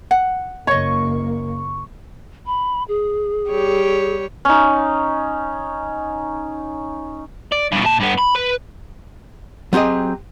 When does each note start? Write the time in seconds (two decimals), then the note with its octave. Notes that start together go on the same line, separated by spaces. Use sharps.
0.11 F#5
0.67 F#1 A#3 C#5 D#5 C#6
2.46 B5
2.88 G#4
3.49 G3 G4 C#5
4.45 C#4 D#4
7.52 D5
7.72 G2 B2
7.85 A#2 A5
8.01 G2 B3
8.19 B5
8.36 B4
9.73 F#3 C4 G4 G#4 D#5